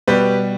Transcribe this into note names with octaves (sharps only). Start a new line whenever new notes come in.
B2 G3 G4 B4